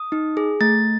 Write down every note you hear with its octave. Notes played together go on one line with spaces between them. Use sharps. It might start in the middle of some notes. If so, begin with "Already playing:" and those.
Already playing: D#6
D#4
G#4
A3 A6